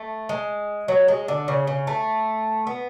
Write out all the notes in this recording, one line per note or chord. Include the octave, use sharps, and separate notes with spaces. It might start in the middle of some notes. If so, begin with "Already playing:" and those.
Already playing: A3
G#3
F#3
G#3
D3
C#3
C#3
A3
B3